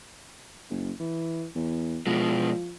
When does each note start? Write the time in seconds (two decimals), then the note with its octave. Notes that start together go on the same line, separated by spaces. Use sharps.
0.70 F#1
1.00 E3
1.55 E2
2.07 B2 F3 G#3